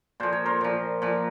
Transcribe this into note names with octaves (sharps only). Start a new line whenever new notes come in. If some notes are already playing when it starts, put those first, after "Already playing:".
A#2 F3 C5
C#5
A#4 C5
A#2 F3
A#2 F3